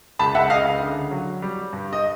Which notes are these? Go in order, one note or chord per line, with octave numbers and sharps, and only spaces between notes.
C#2 A5 B5
E5 F#5
C#3 D#5 F5
D3
F#3
G3
G2
D#5